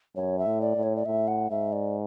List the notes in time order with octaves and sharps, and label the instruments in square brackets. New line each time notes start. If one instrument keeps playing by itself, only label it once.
[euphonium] F#2 [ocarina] C#5
[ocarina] E5
[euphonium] A2
[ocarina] D5
[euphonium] A2
[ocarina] C#5
D5
[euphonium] A2 [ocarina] E5
[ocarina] F#5
[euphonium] G#2 [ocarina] E5
[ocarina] D5